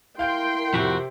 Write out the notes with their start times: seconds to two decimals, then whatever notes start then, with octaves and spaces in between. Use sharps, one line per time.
0.19 E4 A#4 F5 G5 C6 G6 D7
0.74 F2 C3 F#4 B6